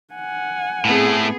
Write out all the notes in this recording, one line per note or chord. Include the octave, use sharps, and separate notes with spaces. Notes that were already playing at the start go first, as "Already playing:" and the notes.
F#5 G#5
A2 A3 B3 C4 G#4